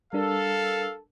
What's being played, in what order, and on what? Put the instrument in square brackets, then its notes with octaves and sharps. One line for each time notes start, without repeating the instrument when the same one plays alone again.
[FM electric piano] G3 D4 A#4 [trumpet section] A4 [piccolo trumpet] F5